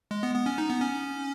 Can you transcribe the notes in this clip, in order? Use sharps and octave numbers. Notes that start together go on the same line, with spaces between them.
G#3
B3
B3
C#4
D#4
B3
C#4